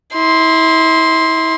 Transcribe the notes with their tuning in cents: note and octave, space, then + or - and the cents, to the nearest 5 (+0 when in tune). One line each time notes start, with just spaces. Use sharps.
E4 -35 C6 +0